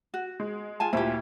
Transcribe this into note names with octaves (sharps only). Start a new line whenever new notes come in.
F#4
G#3
F4 G#5 A5
D2 A#2 E4 G4